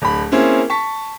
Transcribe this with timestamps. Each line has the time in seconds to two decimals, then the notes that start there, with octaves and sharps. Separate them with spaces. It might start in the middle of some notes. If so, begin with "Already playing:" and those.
0.02 D1 B5
0.32 A#3 C4 C#4 E4 G#4
0.70 A5 C#6 B6